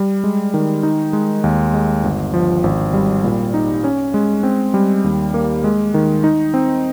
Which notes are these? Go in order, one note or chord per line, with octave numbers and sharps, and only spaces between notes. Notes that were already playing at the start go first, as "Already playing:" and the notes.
Already playing: G3
G#3
D#3
D#4
G#3
D#2
G#3
G1
F3
G#1
G3
A#2
D#4
C#4
G#3
C4
G3
D#2
A#3
G#3
D#3
D#4
C4